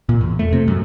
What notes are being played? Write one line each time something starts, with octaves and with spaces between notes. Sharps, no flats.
A#2
E2
A3
C3
F#2